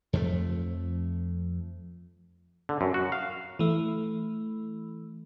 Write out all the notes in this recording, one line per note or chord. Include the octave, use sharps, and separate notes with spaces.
F2 F3 F#3 A3
D3
F#2
F#4
F5
E3 A3